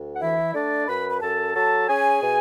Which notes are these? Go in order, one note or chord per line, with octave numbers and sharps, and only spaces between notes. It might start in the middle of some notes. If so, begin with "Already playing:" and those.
Already playing: D2
F#5
E3 E4 E5
A3 D4 D5
F#2 B4 B5
B5
F#2 A4 A5
F#3 A4 A5
C#4 G#4 G#5
B2